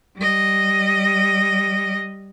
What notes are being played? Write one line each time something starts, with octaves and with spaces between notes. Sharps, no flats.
G3 D#5